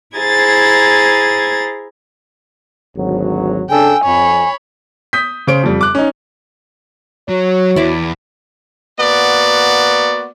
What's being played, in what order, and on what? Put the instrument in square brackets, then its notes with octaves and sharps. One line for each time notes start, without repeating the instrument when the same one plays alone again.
[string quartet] E4 G#4 C5 A#5 G#6 A6
[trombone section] G#1 D2 F#3
[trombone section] C#3 D4 A4 [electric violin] G5 E6 [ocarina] G#5
[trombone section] F2 [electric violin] C#5 B5
[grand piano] D#6 G6 B6
C#3 C5 D7
F2 G3
D6 F#6
C#4 D#4
[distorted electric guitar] F#3 [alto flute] F#4 [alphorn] C#5
[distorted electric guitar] E2 [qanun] E4 D5 D6
[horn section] A#3 B3 F#4 D5